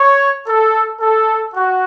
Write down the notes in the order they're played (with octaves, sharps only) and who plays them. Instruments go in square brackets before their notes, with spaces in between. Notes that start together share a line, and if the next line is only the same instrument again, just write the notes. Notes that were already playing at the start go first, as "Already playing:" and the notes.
Already playing: [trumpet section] C#5
A4
A4
F#4